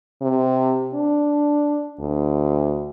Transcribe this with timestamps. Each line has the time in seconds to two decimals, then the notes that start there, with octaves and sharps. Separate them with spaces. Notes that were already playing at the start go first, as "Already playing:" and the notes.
0.22 C3
0.94 D4
2.00 D2